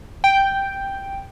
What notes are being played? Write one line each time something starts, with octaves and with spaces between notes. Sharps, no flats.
G5